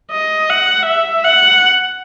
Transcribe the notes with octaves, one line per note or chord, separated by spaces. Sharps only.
D#5
F#5
E5
F#5